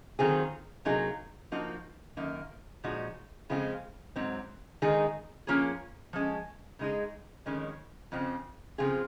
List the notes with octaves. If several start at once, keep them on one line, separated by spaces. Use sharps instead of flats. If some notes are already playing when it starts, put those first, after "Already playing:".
D#3 F#3 C4 F4 G#4
C3 F#3 A#3 D#4 G#4
F3 A#3 D#4 F#4
F#2 D#3 A#3
A#2 F3 G#3 D#4 F#4
C#3 F3 G#3 C4 F4
G#2 F#3 C4
D#3 G#3 D#4 G#4
F3 A#3 C#4 F4 G#4
F3 G#3 C#4
C#3 G#3 D#4 G#4
F2 D#3 G#3 C#4
F2 C#3 F3 C4
C#3 F3 C4 F4 G#4